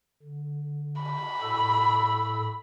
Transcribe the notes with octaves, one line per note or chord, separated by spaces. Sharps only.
D3
B5
A2 A4 E6